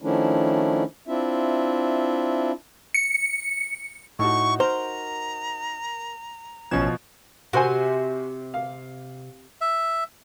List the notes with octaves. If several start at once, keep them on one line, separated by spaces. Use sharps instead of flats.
D#3 F3 A3 C#4 D4 E4
C4 D4 E4 F4 E5
C#7
A2 D#4 F#4 C#6
A#4 C5 A#5
A1 B2 F3 C#4 G#6 E7
C3 F#4 C5 G#5
F5
E5